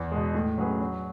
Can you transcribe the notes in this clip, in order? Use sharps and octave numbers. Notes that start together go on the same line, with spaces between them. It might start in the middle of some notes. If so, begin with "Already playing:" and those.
Already playing: E2
B2 G#3
A2
F#3 C#4 G#4 B4
F#3